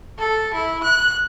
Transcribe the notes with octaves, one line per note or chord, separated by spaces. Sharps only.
A4
E4
F#6